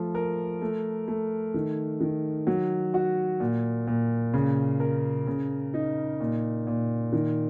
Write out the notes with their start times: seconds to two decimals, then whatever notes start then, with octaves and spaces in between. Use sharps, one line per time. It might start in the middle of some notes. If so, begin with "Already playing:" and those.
Already playing: F3 A3
0.15 A#4
0.62 A3
1.08 A3
1.54 D#3
2.01 D#3
2.47 F#3
2.94 F#4
3.40 A#2
3.87 A#2
4.34 C#3
4.80 A#4
5.27 C#3
5.74 D#4
6.20 A#2
6.67 A#2
7.13 D#3